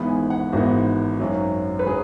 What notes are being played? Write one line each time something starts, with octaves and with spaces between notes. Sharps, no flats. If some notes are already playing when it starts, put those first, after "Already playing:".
Already playing: G#1 G#2 E3 B3 B5
G#5
F#5
G#1 G#2 E3 B3 F#4
G#1 F#2 F#3
B4
F#3 G#4